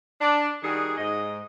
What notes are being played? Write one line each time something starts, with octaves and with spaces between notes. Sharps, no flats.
D4
D#3 G3 F#4 G#4
G#2 D#5